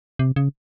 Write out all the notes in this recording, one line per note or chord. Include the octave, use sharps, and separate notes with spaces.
C3
C#3